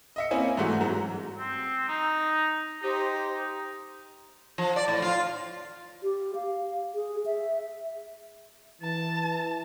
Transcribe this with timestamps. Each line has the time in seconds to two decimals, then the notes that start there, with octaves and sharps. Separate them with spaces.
0.16 D#5 E5 C#7
0.31 A#3 C4 C#4 E4 G#5
0.57 G#2 E3 G3 A3 F#4
0.81 G#2 F#3
1.37 C4
1.88 D#4
2.82 D#4 G4 C5
4.58 F3
4.76 D5
4.88 A2
5.02 F4
6.03 G4
6.35 F5
6.95 G#4
7.26 E5
8.82 E3 A5